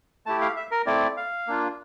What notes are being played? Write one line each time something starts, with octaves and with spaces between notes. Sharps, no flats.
A3 E4 G4 A5
F5
E5
A#4
A3 C4 E4 D5
F5
A#3 D4 F4